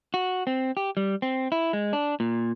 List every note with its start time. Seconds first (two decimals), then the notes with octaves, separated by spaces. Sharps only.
0.14 F#4
0.47 C4
0.77 G4
0.97 G3
1.22 C4
1.52 E4
1.73 G#3
1.93 D4
2.20 A#2